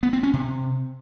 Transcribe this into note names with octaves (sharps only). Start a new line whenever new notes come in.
B3
C4
C#4
C3